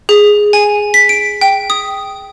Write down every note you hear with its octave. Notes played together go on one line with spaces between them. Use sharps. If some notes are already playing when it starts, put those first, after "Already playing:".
G#4
G#5
B6
D7
G5
D#6